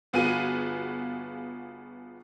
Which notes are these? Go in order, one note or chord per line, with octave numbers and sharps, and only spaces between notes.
G1 B3 F4 F#4 G#4 D#7